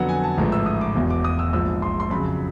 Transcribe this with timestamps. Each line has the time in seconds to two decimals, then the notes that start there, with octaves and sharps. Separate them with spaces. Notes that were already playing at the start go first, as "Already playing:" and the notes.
Already playing: F2 D3 F#3 B3 F#5
0.09 G#5
0.24 A5
0.38 A1 G#2 F3 A3 A#5
0.52 E6
0.66 D#6
0.81 D6
0.95 E1 E2 B2
1.10 D6
1.24 D#6
1.39 E6
1.53 A#1 G#2 F3 E6
1.82 C6
2.00 C6
2.10 F2 C#3 F#3 B5